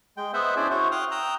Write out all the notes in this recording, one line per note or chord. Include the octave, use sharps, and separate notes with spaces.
G#3 G5
B3 C5 D#5 E5 F#5
C#4 D4 E4 G#4 C5 D5
E4 F#4 C5 C#5
F5 G5 D#6 F6 F#6
G5 A#5 D#6 E6 F#6